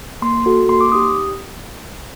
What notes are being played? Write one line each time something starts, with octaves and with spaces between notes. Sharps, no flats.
A#3 C6
F#4 A4
A#3 C6
D6
D#4 G4 D#6